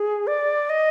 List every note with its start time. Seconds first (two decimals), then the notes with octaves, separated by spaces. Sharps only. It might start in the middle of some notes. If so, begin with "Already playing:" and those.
Already playing: G#4
0.27 D5
0.70 D#5